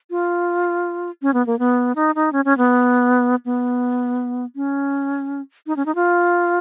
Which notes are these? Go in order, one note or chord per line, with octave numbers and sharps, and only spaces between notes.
F4
C#4
B3
A#3
B3
D#4
D#4
C#4
C#4
B3
B3
C#4
D#4
C#4
D#4
F4